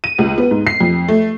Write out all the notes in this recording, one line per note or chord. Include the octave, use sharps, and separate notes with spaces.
D#7
C#2
B3
G#2
C7
F2
A3